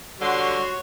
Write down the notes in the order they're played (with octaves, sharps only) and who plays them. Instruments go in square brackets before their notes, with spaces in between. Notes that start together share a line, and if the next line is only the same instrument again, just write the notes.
[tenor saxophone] D3 [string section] G3 C6 [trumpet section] F#4 [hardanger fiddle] C#5